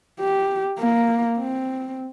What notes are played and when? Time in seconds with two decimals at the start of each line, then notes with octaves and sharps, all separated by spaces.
0.20 G4
0.79 A#3
1.38 C4